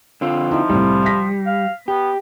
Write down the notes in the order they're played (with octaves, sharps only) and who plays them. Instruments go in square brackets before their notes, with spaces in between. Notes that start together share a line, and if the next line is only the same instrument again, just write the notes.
[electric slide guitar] D3 C4 F4
[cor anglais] F3 [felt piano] D#4 E4
[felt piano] C2 A2 C3 [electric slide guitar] G3
[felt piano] A#6 B6
[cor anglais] F5
[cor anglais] B3 [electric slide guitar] G4